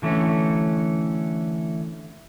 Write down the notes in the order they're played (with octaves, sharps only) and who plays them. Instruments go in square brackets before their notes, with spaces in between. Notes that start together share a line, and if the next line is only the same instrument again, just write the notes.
[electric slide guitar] D3 E3 A3 C4 C#4